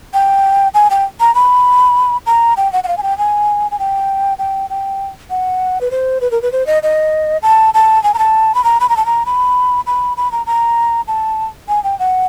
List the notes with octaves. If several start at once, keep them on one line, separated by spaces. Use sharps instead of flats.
G5
G#5
G5
A#5
B5
A#5
G5
F#5
F#5
F5
G#5
G5
G#5
G#5
G5
G5
G5
F#5
B4
C5
B4
A#4
B4
C5
D#5
D#5
A5
A5
G#5
A#5
A5
B5
A#5
B5
A#5
A5
A#5
B5
B5
B5
A#5
A#5
A5
G#5
G5
F#5